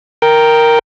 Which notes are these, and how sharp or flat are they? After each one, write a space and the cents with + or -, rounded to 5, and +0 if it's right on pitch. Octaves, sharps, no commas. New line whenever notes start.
A#4 +0 G5 +0